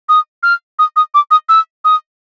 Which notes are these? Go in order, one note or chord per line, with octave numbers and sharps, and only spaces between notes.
D#6
F6
D#6
D#6
D6
D#6
E6
D#6